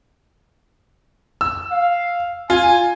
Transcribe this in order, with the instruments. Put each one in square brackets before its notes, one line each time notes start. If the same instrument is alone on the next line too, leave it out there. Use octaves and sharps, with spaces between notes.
[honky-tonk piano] E6
[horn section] F5
[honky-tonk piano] F4 [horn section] G#5